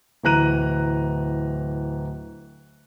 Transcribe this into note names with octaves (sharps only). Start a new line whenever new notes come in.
D1 E3 A#5 F#6 D#7